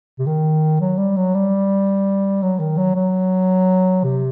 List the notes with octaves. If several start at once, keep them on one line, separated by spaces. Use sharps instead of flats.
C3
D#3
F#3
G3
F#3
G3
F#3
D#3
F#3
F#3
C3